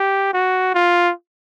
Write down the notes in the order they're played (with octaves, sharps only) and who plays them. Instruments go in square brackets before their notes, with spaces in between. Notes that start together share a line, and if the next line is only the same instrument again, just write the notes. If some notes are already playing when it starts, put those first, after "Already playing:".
Already playing: [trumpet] G4
F#4
F4